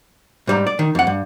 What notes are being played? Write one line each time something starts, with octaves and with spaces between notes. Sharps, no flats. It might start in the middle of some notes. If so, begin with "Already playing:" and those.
G#2 G3 A#5
D5
D#3
F2 F#5
G2